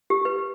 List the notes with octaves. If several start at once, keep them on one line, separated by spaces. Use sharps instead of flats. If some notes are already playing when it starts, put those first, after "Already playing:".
G4
B4